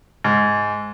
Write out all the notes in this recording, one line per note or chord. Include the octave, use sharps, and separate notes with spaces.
G#2